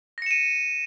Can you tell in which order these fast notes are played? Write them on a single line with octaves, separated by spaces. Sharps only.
A#6 C#7 E7 D#7